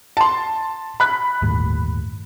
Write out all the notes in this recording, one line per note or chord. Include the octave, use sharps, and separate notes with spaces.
A5 C6
B5 F#6
G1 D#2 A2